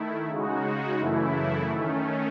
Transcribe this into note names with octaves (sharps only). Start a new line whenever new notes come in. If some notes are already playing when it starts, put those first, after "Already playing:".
Already playing: D#3 A3 E4
C#3 G#3 D#4 F#4
F#2 C#3 E3 A3 E4
D#3 A3 C#4